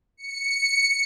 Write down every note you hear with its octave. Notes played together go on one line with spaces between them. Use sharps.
C#7